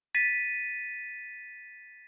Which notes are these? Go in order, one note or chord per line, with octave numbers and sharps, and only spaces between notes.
A6 B6 D#7